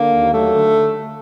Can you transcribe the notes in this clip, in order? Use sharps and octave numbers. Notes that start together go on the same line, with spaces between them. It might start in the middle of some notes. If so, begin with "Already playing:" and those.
Already playing: D3 A#3
D#2
F#3 A3
D3